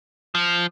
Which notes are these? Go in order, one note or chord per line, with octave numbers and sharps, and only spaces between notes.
F3